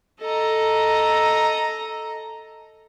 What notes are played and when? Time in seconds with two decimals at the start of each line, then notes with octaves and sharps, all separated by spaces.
0.21 A4 D#5 A#5